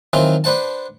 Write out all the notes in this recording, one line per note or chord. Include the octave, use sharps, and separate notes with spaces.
D#3 E3 F#3 C4 F4
D4 B4 C5 F#5 A5